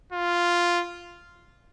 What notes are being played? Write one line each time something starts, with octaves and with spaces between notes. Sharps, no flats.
F4